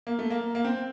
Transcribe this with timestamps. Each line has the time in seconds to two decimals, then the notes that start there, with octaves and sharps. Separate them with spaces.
0.07 A#3
0.19 A3
0.30 A#3
0.55 A#3
0.64 C4